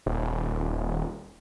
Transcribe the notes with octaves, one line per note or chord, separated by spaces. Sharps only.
D#1